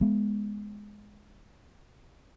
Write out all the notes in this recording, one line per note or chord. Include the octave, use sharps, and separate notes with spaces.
G#3 B3